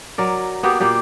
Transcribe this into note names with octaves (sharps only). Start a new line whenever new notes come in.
F#3 A#4 D5
A#3 B3 F#4 G4
A#2 A#3 G4 D5